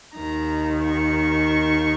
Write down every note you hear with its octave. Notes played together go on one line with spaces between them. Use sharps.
D#2 D#3 A#5
C#6